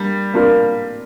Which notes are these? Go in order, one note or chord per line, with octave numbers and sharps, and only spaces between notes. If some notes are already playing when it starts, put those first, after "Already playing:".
Already playing: G3 A#3 D4
A#3 D4 F4 A#4